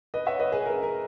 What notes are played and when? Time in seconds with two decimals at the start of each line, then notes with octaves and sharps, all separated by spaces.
0.14 B4 D#5
0.26 C#5 E5
0.39 B4 D#5
0.52 G#4 B4
0.66 A#4
0.83 A#4